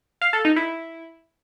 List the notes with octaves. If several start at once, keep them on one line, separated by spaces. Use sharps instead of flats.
F5
A4
D#4
E4